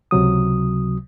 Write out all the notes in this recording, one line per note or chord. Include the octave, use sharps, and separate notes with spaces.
C#2 C3 F#3 D#6